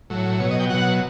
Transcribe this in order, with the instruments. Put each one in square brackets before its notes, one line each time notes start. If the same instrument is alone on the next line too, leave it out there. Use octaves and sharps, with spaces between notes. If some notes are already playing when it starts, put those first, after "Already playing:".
[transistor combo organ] A2 F#3
B2 C#5
F#3
D#5
G5
B2 F#3 F#5